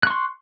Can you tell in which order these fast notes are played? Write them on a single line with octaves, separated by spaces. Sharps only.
F#6 C#6 C6